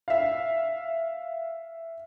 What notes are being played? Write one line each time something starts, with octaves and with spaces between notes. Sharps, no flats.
E5 F5